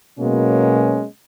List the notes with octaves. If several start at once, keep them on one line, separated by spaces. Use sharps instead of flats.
B2 F#3 G#3 A#3 B3 C#4